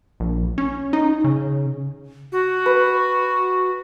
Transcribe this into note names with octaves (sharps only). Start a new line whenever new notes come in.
A#1
C#4
D#4
C#3
F#4
B4